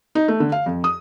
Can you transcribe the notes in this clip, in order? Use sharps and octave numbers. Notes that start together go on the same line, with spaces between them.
D#4
A3
D3
F5
F2
D#6